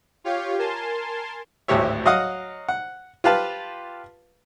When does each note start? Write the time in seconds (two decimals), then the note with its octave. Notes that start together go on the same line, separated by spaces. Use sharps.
0.24 F4 G4 C#5 F5
0.59 A#4 G#5 A5 C6
1.68 G#1 D2 A2 G4 C#5 E5
2.05 F#3 D#5 F5 F#5 D#6
2.69 F#5
3.24 F4 G4 B4 F5 A5